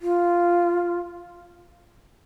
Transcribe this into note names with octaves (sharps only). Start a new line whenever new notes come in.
F4